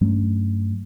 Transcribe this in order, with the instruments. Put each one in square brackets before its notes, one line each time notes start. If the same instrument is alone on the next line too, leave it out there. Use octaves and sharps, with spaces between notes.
[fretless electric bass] G2 F#3 A3 C#4